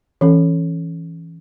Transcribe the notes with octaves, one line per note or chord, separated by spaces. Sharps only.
E3 C#4 A4